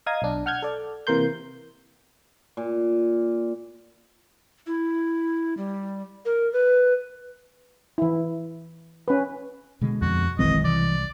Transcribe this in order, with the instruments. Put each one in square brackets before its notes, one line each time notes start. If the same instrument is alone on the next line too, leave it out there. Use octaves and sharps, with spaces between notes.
[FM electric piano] D#5 F5 A#5 D#6 G#6
B1 D4
F#5 F6 G6 G#6
A4 D5
C3 E3 A#3 A#4 C6 G6
[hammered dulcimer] A#2
[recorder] E4
G3
A#4
B4
[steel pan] E3 E4
C#4 B4
[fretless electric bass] B2 D3 G#3
[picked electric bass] F2 [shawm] F#4
[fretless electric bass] F#1 E3 C4 [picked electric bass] B1 D#3 G#3 [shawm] D#5
[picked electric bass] C2 [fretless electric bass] E3 [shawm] D5